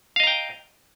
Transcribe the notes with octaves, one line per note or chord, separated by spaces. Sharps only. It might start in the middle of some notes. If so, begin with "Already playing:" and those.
D#5 F5 G5 A#5